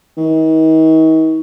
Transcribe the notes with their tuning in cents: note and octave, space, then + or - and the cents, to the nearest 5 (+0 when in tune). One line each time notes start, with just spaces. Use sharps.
D#3 +40